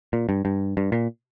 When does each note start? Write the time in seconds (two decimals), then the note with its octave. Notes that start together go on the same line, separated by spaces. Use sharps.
0.13 A#2
0.29 G2
0.45 G2
0.77 G2
0.92 A#2